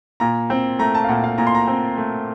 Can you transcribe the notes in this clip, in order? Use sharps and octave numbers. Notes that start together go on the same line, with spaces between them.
A#2 A#5
C4
A3 A#5
A5
F5
A#2 F#5
F5
A#2 A#5
C6
A#5
C4
A3